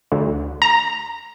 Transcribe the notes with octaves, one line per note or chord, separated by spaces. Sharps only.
D2
A#5